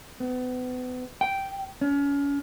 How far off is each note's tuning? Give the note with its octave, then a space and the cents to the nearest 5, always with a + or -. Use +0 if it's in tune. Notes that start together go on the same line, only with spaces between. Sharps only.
B3 +35
G5 -5
C#4 +35